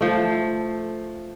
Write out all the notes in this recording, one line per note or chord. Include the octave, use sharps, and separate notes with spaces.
F3 A3